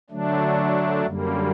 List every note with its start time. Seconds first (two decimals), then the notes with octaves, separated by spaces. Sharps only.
0.10 D3 F#3 A3 D4
1.06 F#2 D3 G3 A#3